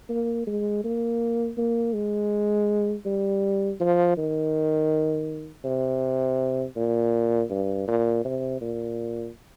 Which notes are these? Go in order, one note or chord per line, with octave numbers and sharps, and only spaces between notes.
A#3
G#3
A#3
A#3
G#3
G3
F3
D#3
C3
A#2
G2
A#2
C3
A#2